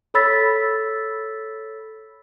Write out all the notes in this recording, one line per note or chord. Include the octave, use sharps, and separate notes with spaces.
A4 C#5 B5 E6 A6 B6